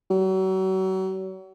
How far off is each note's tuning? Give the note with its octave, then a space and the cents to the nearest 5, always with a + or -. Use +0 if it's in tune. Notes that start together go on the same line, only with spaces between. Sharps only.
F#3 +35